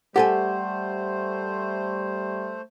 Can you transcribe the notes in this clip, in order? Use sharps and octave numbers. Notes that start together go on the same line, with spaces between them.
G3 A3 G4 A4 C5 F#5 G#5